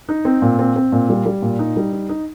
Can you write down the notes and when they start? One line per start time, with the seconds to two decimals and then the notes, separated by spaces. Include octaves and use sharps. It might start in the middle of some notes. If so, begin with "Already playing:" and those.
0.09 D#4
0.25 C4
0.42 A#2
0.59 C4
0.76 C4
0.92 A#2
1.09 G3
1.26 G3
1.42 A#2
1.59 D#4
1.76 G3
1.93 D#4
2.09 D#4